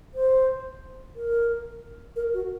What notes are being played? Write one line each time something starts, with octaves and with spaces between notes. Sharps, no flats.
C5
A#4
A#4
F#4